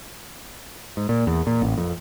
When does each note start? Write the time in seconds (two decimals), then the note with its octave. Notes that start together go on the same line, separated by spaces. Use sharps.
0.97 G#2
1.09 A#2
1.27 E2
1.47 A#2
1.62 A1
1.78 F2